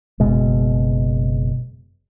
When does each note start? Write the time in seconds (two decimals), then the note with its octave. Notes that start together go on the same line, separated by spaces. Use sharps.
0.20 F#1 B2 G#3